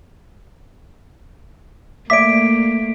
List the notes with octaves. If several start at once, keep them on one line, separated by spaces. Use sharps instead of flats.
A3 A#3 D5 E5 D6 B6 D7